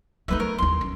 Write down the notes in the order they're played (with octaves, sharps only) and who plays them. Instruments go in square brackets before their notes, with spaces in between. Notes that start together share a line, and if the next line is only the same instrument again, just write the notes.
[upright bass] F#3 A3 [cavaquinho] D#4 B4 E5
[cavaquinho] A#4 C#5
[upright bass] D#2 E4 [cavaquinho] C6
[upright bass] F#2